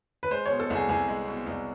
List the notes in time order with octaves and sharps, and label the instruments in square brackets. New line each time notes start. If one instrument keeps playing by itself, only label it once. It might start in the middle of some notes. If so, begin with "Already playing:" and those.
[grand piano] B4
G#3 C5
B2 C#5
A4
C2
G#4
C2 G#4
G#3
B2
C2